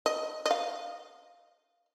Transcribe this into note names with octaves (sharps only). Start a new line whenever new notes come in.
D#5
D#5
F5